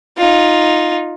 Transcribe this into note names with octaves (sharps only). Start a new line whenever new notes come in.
D#4 F4